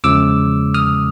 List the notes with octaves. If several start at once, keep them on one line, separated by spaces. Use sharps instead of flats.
E2 C#3 F3 G#3 D6 E6
D#6 F6